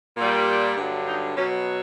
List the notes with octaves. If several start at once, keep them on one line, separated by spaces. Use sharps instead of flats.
A#2 G3
G2 D3 F#3
D#4
B2 F#3 C#4